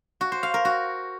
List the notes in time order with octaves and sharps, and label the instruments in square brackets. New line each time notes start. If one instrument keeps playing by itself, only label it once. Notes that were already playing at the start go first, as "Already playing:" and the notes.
[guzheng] F#4
C5
F5
A#4
F#4